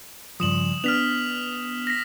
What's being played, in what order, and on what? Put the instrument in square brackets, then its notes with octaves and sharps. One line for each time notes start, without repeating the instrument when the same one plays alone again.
[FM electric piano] G2 C#3 F3 [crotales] D#6 E7 F#7
[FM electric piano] B3 D4 [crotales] F6 B6 F7
[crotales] A#6 B6